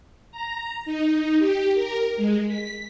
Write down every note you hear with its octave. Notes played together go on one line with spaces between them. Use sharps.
A#5
D#4
G4
A#4
G#3
B6